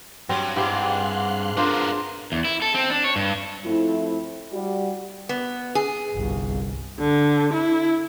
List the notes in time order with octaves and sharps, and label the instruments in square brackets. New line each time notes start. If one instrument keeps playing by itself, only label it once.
[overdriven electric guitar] G2 [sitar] F#3 [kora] C4
[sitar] G#2 [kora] E4 G4 C5 [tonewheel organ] F5 C6 F#6
[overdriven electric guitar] B3 A#4 [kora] D4 F4 C5
[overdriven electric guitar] E2
E4
A4
C4
D4
C#5
G2
[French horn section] F3 A3 C4 E4
G3 F#4
[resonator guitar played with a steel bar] B3
G#4
[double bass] G1 C2
[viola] D3
E4